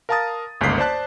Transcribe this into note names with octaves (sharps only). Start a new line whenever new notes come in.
A#4 F5 A5 A#5 D#6 A6
G1 C#2 G#2 A#3 B6 C7
C5 D5 A5 F#6